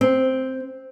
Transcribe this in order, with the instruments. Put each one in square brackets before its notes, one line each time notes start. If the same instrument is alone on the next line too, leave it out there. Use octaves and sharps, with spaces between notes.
[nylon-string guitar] C4